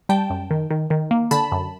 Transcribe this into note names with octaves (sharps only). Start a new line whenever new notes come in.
G3 G5 A5
F#2
D#3
D#3
D#3
A#3
D3 A5 B5
F#2